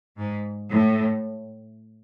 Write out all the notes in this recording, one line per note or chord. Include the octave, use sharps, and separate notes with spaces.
G#2
A2